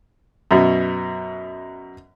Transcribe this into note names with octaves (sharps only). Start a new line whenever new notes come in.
F#2 B2